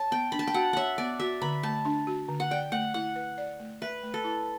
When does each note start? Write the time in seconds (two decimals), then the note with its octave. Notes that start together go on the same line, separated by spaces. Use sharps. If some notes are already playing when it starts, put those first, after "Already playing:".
Already playing: C#5 A5
0.11 B3 G5
0.32 D4 B5
0.39 A5
0.47 G5
0.54 F#4 F#5
0.73 C#5 E5 F#5
0.98 B3 D5
1.20 F#4 E5
1.42 D3 B5
1.63 A3 A5
1.85 D4
2.07 F#4
2.29 D3
2.40 F#5
2.51 D5 G5
2.72 A3 F#5
2.94 E4 F#5
3.16 B4
3.38 D5
3.60 A3
3.82 B4 E5
4.03 A3
4.14 A4
4.24 E4